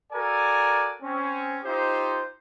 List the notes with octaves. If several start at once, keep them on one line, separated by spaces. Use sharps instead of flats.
F#4 A4 A#4 D5 G#5
C4 C#4
D#4 F4 G4 C5